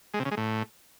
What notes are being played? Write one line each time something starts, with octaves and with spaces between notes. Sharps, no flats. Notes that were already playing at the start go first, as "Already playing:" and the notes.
G#3
C3
C#3
G#3
A2